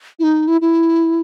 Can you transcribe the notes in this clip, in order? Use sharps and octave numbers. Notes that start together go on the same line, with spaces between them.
E4
D#4
E4
E4